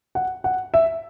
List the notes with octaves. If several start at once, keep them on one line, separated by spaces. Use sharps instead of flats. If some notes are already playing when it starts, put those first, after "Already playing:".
F#5
F#5
E5